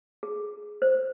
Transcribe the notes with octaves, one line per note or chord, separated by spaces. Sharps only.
G#4
C5